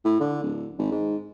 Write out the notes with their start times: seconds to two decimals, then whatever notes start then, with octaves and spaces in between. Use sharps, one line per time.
0.05 A2
0.20 D3
0.43 D1
0.79 G#1
0.91 G#2